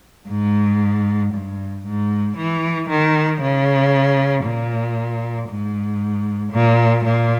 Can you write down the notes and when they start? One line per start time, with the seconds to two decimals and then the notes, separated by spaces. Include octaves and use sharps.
0.28 G#2
1.33 G2
1.85 G#2
2.37 E3
2.89 D#3
3.41 C#3
4.44 A#2
5.49 G#2
6.52 A#2
7.04 A#2